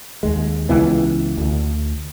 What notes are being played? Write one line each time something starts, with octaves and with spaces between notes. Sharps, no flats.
D#2 G#3
C#2 E3 B3
D2